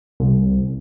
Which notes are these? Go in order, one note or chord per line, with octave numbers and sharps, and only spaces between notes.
C2